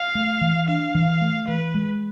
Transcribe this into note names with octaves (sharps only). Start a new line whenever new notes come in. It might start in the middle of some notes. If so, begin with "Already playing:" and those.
Already playing: F5
A3
E3
D4 F5
E3
A3
E3 B4
G#3